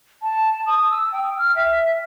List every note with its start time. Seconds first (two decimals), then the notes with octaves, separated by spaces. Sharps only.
0.22 A5
0.67 D#6
0.90 E6
1.12 G5
1.38 F6
1.56 E5